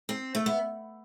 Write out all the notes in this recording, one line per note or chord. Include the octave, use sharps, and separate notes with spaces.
C4
A3
B3